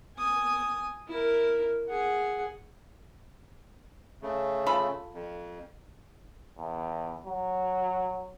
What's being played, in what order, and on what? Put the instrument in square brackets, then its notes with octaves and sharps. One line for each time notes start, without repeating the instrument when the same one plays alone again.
[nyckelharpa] G#5 D#6
E4 A#4
G#4 F#5
[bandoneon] C#3 A3
[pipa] F4 A4 B5
[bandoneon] F2
[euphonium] E2
F#3